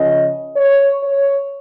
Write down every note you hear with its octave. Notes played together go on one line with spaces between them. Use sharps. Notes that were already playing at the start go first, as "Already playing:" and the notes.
Already playing: C#3 F3 C#4 D#5
C#5
C#5